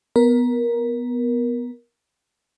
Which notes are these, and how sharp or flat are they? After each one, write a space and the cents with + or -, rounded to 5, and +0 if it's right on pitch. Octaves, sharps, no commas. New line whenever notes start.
B3 +0 A#4 +15